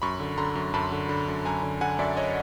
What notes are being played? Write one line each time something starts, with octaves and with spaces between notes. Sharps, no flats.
F#2 B5 C#6
D3
D3 A#5 C6
F#2
F#2 A5 B5
D3
D3
F#2
F#2 G#5 A#5
D3
D3 F#5 G#5
F#2 D5 E5
C#5 D#5